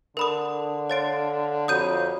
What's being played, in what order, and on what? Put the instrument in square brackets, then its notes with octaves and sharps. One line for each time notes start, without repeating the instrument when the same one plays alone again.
[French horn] D3 [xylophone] A#4 B5 D#6
[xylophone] C#5 A6 D7 [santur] F5 C6
[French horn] F2 [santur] F#3 G3 A#5 [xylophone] D#6 G6 D#7